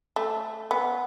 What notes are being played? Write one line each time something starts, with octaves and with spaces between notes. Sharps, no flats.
A3
B3